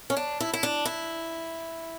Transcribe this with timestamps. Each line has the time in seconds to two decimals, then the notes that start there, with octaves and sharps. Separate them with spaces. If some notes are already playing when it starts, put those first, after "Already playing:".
0.10 C#4
0.17 D4
0.40 E4
0.53 E4
0.63 D4
0.85 E4